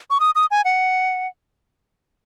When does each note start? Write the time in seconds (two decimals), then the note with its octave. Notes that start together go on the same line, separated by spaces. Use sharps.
0.10 C#6
0.20 D#6
0.35 D#6
0.51 G#5
0.65 F#5